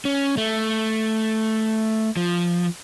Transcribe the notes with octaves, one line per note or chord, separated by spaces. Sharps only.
C#4
A3
F3